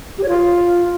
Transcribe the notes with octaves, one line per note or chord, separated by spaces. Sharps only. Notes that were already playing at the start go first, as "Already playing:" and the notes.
G4
C#5
F4